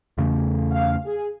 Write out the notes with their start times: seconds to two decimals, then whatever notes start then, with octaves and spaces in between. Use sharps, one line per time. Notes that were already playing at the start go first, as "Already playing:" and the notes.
0.18 E2 C#3 A3
0.71 F5
1.05 G#4